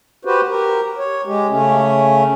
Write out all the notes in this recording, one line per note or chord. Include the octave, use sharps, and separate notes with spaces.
F#4 G4 B4 C5
G4 A#4
C#5
G#3 G4
C#3 A3 C#4